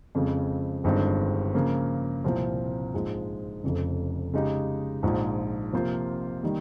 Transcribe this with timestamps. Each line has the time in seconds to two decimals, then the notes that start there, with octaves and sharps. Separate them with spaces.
0.15 F2 C#3 G#3 C4
0.84 G1 G2 D#3 G#3 C4
1.54 C#3 F3 A#3
2.24 C2 A#2 F3 C4 F4
2.94 A#1 G#2 F3 G#3
3.64 F1 F2 C#3
4.33 C#3 G#3 D#4 G4
5.03 A#1 G#2 F3
5.73 C3 F3 A#3 F4 C5
6.43 D#3 G3 A#3